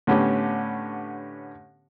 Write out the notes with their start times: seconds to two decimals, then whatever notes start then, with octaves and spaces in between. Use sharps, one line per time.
0.07 A2 D3 B3 C#4 G4